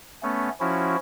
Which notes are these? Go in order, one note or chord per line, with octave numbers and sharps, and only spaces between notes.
A3 B3 C#4
F3 C#4 E4 F#4